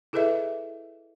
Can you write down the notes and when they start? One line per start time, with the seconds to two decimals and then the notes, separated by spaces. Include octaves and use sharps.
0.13 E4 G#4 A4 B4 D#5 E5